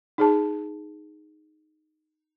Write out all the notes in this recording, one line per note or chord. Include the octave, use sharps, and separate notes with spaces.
D#4 G#4 A5